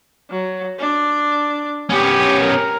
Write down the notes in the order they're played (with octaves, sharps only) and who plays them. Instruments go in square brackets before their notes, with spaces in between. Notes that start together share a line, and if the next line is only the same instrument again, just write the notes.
[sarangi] F#3
D4
[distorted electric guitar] B3 C#4 [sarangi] G4
[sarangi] A#4